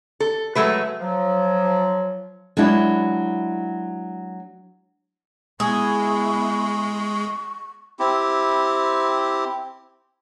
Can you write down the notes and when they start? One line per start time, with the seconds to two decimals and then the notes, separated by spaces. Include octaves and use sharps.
0.20 A4
0.55 F#3 G#3 A3 B4
1.01 F3 F#3
2.57 F#3 G#3 D4 E4
5.60 G#3 B3 E4 G#4 C#6
7.99 C4 E4 G4